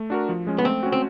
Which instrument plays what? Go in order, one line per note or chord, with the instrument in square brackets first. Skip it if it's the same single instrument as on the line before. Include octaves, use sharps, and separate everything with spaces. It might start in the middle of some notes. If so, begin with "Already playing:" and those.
Already playing: [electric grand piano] A3
D4 F#4 A#4
F3
G#3 C#4
[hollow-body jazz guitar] B3
[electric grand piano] A3 [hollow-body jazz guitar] C4
[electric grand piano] C#4 F#4
[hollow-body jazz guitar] C4